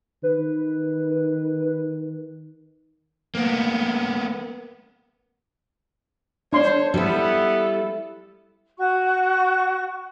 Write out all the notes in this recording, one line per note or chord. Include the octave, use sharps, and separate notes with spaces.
D#3 B4
A#3 B3
D4 C5 C#5 C6
G3 B3 E4 A4
F#4 C#6